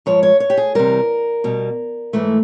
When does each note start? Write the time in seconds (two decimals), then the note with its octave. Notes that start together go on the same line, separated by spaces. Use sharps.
0.06 G#2 F3 G#3 C#5
0.23 C#5
0.40 C#5
0.50 G4
0.57 G#4
0.75 C3 E3 G3 A#4
1.44 B2 G3
2.13 G#2 E3 A3